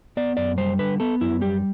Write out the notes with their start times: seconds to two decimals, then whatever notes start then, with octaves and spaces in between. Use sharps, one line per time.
0.17 B3 D5
0.37 F#2 D5
0.58 G3 C5
0.79 D3 B4
1.00 B3 A4
1.21 F#2 E4
1.41 G3 G4